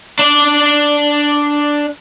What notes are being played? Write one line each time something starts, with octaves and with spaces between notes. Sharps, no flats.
D4 D5